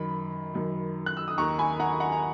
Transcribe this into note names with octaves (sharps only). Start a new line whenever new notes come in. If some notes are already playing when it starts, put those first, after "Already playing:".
Already playing: F#2 D#3 B5
F#2 D#3
F#6
E6
D#6
D#2 D#3 A#5 C#6
G#5 B5
F#5 A#5
F#5 A#5
A#5